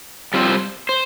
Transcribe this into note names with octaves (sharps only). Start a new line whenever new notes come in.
G3 C4 F4 C5
C5